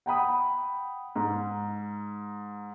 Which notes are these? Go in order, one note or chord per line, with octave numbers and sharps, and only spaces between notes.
F#5 G5 B5 D#6
G#2